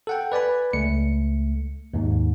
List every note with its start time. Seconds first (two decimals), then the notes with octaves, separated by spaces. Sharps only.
0.07 A4 F#5 G5
0.32 B4 D5 G#5 B5
0.73 C#2 A3 C#7
1.94 D#2 G#2